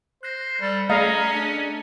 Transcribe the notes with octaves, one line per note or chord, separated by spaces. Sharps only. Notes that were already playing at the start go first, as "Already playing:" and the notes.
C5 F#6 A#6
G3 A4
A3 C#4 G#4 D5 D#5 F5 A#5
D4